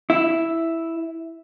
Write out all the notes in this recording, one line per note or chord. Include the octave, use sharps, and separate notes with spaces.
E4